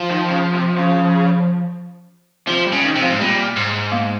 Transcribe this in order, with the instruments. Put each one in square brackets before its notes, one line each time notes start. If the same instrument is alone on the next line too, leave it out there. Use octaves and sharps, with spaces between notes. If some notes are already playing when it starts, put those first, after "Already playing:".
Already playing: [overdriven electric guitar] F3
[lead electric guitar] D#3
C#3
C3
C#3
[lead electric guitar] C3 [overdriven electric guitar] F3
[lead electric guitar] G3
[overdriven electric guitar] C#3
[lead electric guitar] D#3
[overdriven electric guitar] C3
[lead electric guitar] F3
[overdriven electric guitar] G#2
[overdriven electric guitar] A#2 [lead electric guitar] G3
[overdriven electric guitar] G#2
[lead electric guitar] A#3